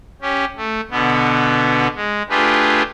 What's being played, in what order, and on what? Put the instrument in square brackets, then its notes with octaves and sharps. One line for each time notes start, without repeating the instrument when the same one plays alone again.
[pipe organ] C#4 G4
A3
B2 D3 B3
G#3
A3 D4 F4 G4 G#4 B4